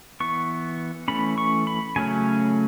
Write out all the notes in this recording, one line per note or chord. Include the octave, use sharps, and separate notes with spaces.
E3 B3 C#6
E3 A3 C#4 B5
C#6
B5
C#3 F#3 A3 C#4 G#5